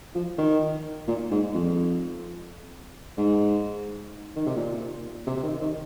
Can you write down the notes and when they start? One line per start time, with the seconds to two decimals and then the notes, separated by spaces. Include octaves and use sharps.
0.15 F3
0.38 D#3
1.08 A#2
1.31 G#2
1.55 F2
3.18 G#2
4.36 D#3
4.46 C3
4.56 A#2
5.27 C3
5.37 C3
5.43 D#3
5.61 D#3